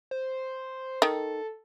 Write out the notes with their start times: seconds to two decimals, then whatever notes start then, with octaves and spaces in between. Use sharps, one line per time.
0.11 C5
1.02 D#3 A4